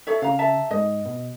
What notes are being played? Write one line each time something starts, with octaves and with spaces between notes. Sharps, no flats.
A4 C#5 E5
C#3 F5 A#5
E5 A5 A#5
G#2 D#5
B2